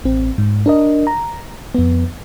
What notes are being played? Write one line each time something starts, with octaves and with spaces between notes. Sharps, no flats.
A1 C4
G#2
D4 A#4 D#5
A#5
F2 B3